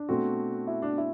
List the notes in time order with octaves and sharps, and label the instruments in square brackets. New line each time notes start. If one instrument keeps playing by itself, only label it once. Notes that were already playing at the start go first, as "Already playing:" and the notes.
Already playing: [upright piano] D4
[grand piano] B2 A3 C4 F#4
[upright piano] E4
D4
E4